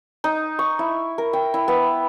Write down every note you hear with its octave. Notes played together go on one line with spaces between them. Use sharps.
D#4
C#6
E4
A#4
G5
E4
B3